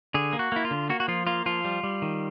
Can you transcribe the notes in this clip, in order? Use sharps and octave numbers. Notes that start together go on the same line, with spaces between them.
D3 G#4
A#3
F#4
A#3 E4
F4
D3
A#3 F#4
F#4
F3 F4
A#3 F4
F3 F4
G3
G3
D#3